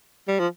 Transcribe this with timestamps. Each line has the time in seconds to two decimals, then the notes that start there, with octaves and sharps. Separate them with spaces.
0.28 G3
0.39 F3